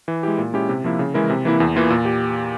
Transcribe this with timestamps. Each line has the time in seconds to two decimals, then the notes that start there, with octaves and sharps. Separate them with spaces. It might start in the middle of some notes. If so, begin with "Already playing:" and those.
0.08 E3
0.23 G#3 E4 G4
0.38 A#2
0.53 G#3 C#4 E4 G4
0.69 C3
0.84 F3 A#3 E4
0.99 C#3
1.14 E3 G#3 E4 A#4
1.30 C3
1.45 E3 A#3 E4
1.60 E2
1.76 E3 A#3 F4
1.90 A#2
2.05 G4